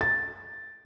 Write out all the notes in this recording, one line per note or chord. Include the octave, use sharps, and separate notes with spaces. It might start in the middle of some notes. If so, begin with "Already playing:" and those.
A6